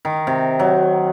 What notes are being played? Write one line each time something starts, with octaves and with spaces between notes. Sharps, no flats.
D#3
C3
F#3